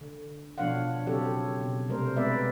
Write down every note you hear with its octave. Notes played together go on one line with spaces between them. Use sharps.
D3
B2 F3 D4 C#5 F5 F#5
C#3 F#3 C4 G4 A4 C#5
B2
C3 G3 A3 A#4 C5
G#3 B3 C4 B4 D5 E5